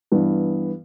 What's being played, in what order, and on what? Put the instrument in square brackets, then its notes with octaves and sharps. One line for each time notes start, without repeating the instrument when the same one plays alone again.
[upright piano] G2 E3 B3